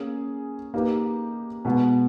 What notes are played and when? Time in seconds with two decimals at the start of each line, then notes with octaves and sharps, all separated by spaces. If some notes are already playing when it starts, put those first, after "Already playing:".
Already playing: A#3 C#4 G#4
0.74 A#3 D#4 G4 B4
1.65 B2 G#3 B3